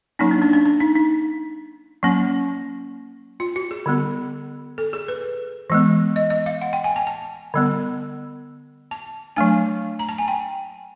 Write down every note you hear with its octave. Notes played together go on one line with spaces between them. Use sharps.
F#3 A#3 C#4 D#4
D4
D4
D4
D4
D#4
D#4
F#3 A#3 C#4
F4
F#4
G#4
D3 G3 B3
A4
G#4
B4
E3 G#3 B3
D#5
D#5
F5
F#5
G5
G#5
A5
A5
D3 G3 B3
A5
F#3 A3 D4 G#5
A#5
A5
G#5
G5